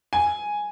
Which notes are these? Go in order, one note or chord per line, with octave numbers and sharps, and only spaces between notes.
G#5